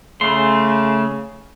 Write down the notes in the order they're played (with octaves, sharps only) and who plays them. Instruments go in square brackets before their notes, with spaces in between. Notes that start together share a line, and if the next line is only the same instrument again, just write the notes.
[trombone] C#3 [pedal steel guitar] A3 C6